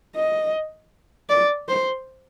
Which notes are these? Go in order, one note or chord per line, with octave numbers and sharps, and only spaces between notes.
D#5
D5
C5